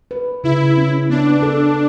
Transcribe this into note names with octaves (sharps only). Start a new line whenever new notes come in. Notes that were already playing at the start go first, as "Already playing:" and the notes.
B4
C#3 E4
C#4
B3 D4
A4